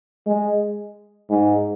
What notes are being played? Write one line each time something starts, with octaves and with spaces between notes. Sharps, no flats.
G#3
G#2